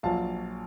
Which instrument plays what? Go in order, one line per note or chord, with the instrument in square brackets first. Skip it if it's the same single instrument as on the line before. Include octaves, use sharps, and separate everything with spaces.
[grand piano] A#1 A#2 F#3 F5 A5